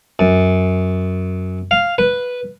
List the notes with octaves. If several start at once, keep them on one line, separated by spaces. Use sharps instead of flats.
F#2
F5
B4